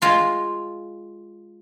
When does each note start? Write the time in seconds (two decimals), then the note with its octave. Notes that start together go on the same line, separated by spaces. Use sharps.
0.02 G#3 F4 C6